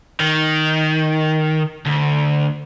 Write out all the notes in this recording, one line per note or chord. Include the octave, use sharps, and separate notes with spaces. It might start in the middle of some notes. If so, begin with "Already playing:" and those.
D#3
D2